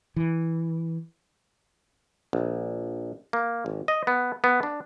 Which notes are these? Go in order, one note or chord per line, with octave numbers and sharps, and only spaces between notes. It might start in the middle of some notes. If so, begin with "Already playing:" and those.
E3
A#1
A#3
G#1
D#5
B3
B3
D4